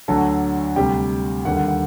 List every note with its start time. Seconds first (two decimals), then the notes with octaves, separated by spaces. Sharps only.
0.08 D2 D3 F#3 A4 A5
0.76 D2 C3 G3 G4 G5
1.45 D#2 D3 G3 F#5
1.57 F#5
1.68 F#5